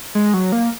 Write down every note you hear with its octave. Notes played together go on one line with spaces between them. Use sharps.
G#3
F#3
A#3